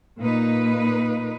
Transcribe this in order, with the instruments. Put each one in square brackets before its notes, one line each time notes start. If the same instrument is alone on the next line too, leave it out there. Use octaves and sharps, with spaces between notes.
[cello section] A#2 A#3 D#4 B4